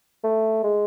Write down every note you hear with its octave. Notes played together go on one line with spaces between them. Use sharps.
A3
G#3